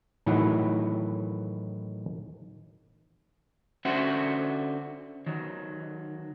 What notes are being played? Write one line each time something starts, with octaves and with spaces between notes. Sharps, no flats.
A2 D#3 E3 F#3 D#4 E4
D3 C#4 F#4 C5 E5 F#5
D#3 F#3